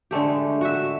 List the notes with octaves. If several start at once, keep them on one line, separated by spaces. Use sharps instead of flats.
D3 G#3 A3 G4
F#4 E5